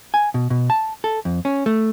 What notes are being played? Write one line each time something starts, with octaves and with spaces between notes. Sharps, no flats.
G#5
B2
B2
A5
A4
F2
C#4
A3